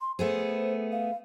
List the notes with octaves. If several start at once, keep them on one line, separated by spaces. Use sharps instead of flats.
C6
A3 B3 G#4 C5
F5